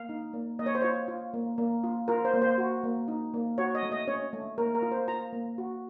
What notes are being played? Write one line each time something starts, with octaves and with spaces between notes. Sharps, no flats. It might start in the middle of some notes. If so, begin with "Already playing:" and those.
Already playing: A#3 F5
D#4
A#3
A#3 D#5
C#5
C5
F4 C#5
F4
A#3
A#3
F4
F4 A#4
C5
A#3
C5
F#4
A#3
D#4
A#3
F#4 C#5
D#5
A3
D#5
C#4 C#5
A3
A#3 A#4
A#4
F4
C5
F4 A#5
A#3
F#4